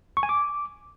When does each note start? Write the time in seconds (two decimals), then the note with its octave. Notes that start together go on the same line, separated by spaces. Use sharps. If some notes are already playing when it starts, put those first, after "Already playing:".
0.17 C#6
0.23 G#5
0.29 D6